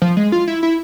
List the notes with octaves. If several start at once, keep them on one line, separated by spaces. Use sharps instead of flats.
F3
G#3
F4
E4
E4